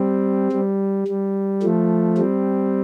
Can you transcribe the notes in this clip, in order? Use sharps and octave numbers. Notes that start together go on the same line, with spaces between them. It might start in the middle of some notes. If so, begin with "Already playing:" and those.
Already playing: G3 C4
G3
G3
F3 A3
G3 C4